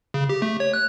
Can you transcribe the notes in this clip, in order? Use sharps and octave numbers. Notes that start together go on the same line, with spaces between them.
C#3
G4
A3
C#5
F#6